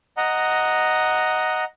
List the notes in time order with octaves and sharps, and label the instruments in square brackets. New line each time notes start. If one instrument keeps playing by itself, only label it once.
[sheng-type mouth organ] D#5 F#5 A#5